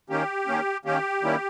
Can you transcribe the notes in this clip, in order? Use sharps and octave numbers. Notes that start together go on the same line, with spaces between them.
D#3 A#3 C#4 G4
D#3 A#3 C#4
D#3 A#3 C#4 G4
D#3 G3 A#3 C#4 E4